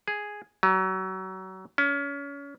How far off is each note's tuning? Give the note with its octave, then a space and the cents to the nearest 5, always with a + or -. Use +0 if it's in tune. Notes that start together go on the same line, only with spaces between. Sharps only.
G#4 +0
F#3 +30
C#4 +30